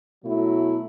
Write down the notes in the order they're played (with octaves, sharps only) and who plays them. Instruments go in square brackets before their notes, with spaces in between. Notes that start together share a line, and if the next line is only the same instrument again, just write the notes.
[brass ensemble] B2 F#3 A3 E4